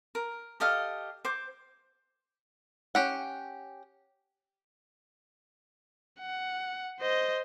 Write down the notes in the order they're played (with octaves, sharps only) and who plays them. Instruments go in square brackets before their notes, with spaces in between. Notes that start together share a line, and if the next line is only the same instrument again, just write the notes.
[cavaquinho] A#4
G4 A4 D#5 F5
C5 D6
[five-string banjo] C#4 G4 F#5
[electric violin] F#5
C5 D#5